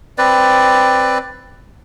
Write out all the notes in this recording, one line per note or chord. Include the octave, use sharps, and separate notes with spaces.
C4 B4 D5